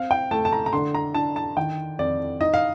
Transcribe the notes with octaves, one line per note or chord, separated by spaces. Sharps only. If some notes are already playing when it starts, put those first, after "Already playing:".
Already playing: C4 F5
G5
A3 A5
A5
A#5
A#5
D3 C6
A#5
D4 A5
A5
D#3 G5
F2 D5
D#4 D#5
F5